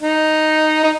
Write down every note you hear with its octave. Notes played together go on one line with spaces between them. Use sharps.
D#4
D#4